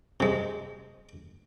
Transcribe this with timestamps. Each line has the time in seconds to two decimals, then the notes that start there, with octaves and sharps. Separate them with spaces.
0.20 C3 G#3